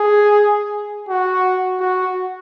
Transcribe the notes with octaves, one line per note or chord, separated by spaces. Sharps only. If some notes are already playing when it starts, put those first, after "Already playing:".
Already playing: G#4
F#4
F#4